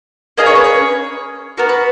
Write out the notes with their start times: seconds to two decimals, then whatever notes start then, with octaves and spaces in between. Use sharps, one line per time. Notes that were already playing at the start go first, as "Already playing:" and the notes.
0.37 A#3 C#4 G#4 D#5
0.46 C#5
0.55 B4
0.64 C#5
1.57 B3 F#4 A#4
1.69 B4